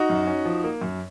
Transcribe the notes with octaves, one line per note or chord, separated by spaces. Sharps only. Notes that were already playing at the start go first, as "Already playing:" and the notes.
Already playing: D#4 F#4
F#2
C#4
F3
A#3
F#2